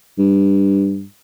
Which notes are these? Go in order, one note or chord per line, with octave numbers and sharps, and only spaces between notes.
G2